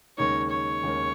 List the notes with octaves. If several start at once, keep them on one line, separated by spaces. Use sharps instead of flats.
D#2 C#3 G#3 D#4 A#4 C#5
C#5
D#2 C#3 G#3 D#4 A#4